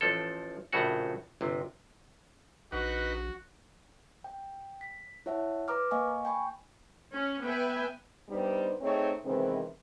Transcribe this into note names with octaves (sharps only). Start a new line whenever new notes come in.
A1 F3 A4
A#1 A2 C#3 A3 F#4 F#5
G1 C3
A#1 D#4 F#4 B4 F#5
G5
B6
E4 C#5 E5 F#5 A5
B4 A#5 D6 F6
A#3 D#5 F5 G#5 C#6
G5 G#5 B5 C#6
C#4
B3 B4 E5 G5 G#5
G2 G3 B3 D#4 G4 C5
A3 C4 D#4 G#4 C#5
C3 D#3 E3 G#3 B3 C4